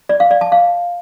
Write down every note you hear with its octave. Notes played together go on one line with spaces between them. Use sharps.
D5
F5
D5
A5
F5